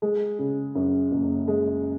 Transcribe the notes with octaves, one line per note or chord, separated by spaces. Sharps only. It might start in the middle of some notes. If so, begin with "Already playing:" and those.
G#3
C#3
F#2
F#1
G#3